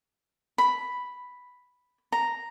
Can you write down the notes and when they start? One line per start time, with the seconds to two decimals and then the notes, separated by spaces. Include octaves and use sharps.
0.58 B5
2.12 A#5